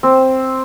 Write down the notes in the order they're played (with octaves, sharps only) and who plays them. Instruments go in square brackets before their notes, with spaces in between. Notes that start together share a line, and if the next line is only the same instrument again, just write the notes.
[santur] C4